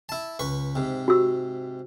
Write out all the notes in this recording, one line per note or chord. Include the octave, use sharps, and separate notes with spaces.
E4 A5
C#2 B4 C#6
G#2 C3
F#4 G4 E6